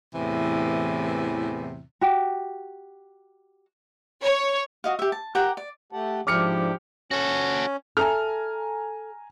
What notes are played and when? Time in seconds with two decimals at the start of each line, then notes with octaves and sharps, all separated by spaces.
0.14 E2 A2 C3 E3
2.01 F#4 G4
4.22 C#5
4.84 F#4 D#5 F5
4.99 G4 E5
5.12 A5
5.35 G4 A#4 F#5 G5
5.57 D5
5.92 A3 G4 F#5 A5
6.27 G#2 F3 D4 E4 G4 D6 F6 C#7
7.11 C#4 F#4 A4
7.97 A4 E5 G#5 A#5 F6